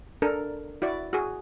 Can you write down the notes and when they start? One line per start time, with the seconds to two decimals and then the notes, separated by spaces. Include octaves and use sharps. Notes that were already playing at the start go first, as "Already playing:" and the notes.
0.22 D4 A4 A#4
0.82 E4 F#4 D5
1.13 F#4 G#4